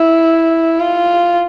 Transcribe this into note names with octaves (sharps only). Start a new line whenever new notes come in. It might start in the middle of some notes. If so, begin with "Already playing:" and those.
Already playing: E4
F4